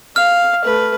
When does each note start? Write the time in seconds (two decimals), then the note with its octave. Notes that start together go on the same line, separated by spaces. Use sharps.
0.16 F5 F6
0.64 A3 B4